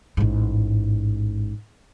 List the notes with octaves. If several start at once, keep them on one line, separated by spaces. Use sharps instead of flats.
A1 G#2